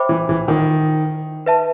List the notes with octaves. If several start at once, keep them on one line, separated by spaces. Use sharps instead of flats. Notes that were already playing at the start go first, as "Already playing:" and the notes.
Already playing: C5 E5 G5 B5 D6
E3
E3
D#3
B4 E5 A5